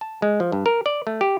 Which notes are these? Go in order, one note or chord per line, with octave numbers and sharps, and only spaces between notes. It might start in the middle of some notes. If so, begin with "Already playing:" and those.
A5
G#3
F3
G2
A#4
D5
A3
G4